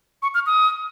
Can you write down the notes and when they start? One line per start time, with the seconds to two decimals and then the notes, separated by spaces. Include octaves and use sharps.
0.23 C#6
0.35 F6
0.46 D#6